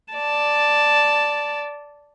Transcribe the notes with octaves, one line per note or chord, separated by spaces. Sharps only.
D5 A5